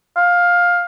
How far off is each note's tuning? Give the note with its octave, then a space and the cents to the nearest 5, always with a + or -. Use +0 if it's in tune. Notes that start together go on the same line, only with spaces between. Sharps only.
F5 +15